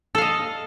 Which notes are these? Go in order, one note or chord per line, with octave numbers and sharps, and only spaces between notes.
A4 D#5 F5